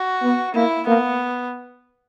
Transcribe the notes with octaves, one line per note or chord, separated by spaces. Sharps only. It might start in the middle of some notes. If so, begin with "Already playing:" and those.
Already playing: F#4
B3
A#3 E4
A#3 B3